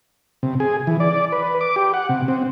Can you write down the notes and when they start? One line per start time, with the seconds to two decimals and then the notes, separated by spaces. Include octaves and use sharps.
0.43 C3
0.60 G#4
0.87 E3
1.00 D5
1.32 B4
1.61 D6
1.76 G4
1.94 F#5
2.09 C3
2.28 C4